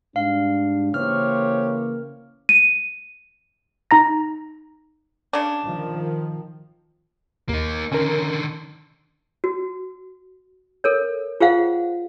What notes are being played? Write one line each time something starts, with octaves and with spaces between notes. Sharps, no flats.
G#2 G3 D4 F5
C#3 E3 A#3 G4 C5 C#5 F6
D#7
D#4 A#5 A#6
C#3 D4
D#3 F3
D#2 A#3 D#4
D3 D#3 C#4 A#4
F#4
A4 A#4 C#5
F4 G#4 C5 F5 F#5